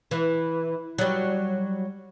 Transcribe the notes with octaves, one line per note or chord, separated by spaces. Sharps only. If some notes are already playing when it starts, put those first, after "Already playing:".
E3
F#3 G3